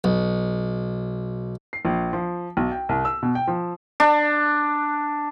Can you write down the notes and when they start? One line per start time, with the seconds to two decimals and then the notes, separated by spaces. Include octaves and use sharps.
0.04 B1
1.73 C7
1.85 A#1
2.13 F3
2.57 B1
2.72 G5
2.89 C2
3.05 E6
3.23 B2
3.35 G5
3.47 F3
4.00 D4